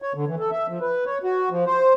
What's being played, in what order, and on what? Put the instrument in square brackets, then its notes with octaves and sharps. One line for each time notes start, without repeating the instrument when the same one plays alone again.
[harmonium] C#5
D3
E3
A4
E5
F3
B4
C#5
F#4
F3
C5